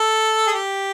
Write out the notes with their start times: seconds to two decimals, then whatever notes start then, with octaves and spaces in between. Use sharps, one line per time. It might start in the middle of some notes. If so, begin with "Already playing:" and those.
Already playing: A4
0.47 G#4
0.54 G4